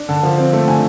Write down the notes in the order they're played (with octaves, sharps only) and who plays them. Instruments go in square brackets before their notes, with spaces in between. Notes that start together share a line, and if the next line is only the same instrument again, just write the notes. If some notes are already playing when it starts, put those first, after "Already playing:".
Already playing: [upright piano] D4
D3 A5
F3
C4
A3
D3 G#5